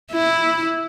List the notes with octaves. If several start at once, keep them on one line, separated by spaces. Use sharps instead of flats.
E4